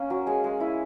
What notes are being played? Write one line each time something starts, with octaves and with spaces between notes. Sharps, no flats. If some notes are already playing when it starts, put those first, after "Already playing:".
Already playing: A#3 C#4
F#3
G#3 G#5
G#3
E4